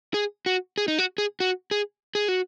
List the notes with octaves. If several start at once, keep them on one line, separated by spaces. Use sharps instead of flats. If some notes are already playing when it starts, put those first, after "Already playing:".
G#4
F#4
G#4
D#4
F#4
G#4
F#4
G#4
G#4
F#4